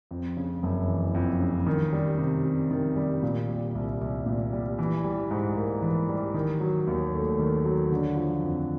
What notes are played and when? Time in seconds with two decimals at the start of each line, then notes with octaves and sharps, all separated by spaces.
0.11 F2
0.37 C#3
0.63 F#1
0.88 E3
1.14 F2
1.40 C#3
1.66 D#3
1.92 G3
2.18 C3
2.45 C3
2.71 D#3
2.96 G3
3.23 A#2
3.48 G3
3.75 C2
4.01 C2
4.26 A#2
4.53 G3
4.79 E3
5.04 G3
5.31 G#2
5.56 A#3
5.82 E3
6.09 G3
6.34 D#3
6.60 F#3
6.87 D#2
7.13 A3
7.39 D#3
7.65 F#3
7.91 D3
8.17 F3
8.43 F2